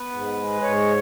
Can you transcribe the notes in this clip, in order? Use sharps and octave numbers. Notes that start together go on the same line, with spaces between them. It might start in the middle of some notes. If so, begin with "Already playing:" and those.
Already playing: B3 B4
G#2
G#3
G#2 C#5